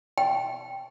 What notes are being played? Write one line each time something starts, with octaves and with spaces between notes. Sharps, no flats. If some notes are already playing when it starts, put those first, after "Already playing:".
G5